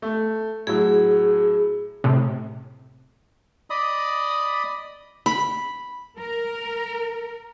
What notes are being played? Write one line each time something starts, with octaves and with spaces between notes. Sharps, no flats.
A3
A2 F#3 G#4
A2 C3
D5 D#5 B5 D#6
B5
A#4